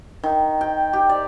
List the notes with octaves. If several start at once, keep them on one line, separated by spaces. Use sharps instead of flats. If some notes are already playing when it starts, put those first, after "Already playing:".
D#3
G5
G4
D5